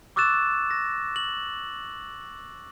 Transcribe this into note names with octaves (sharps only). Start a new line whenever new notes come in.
C#6 D6 E6 F#6 A6 E7
A#6
F#7